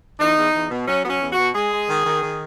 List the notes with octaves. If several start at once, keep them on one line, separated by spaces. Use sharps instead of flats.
E2 D#4
E2
E2
B2
F#3 C#4
F#3 B3
C#4
E2
B2 F#4
G#3 G#4
G#3
D#3
D#3
D#3